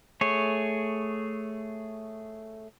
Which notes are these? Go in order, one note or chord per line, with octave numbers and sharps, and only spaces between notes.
A3 G#4 C#5